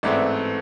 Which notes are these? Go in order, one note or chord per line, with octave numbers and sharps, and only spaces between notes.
A1 G#2 E3 A3 C4 D5 E5